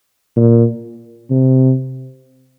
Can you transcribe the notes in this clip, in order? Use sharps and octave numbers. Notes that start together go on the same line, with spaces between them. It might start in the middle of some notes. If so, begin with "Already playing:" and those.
A#2
C3